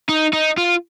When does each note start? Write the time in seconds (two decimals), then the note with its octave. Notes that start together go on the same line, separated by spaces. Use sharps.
0.09 D#4
0.33 D#4
0.57 F4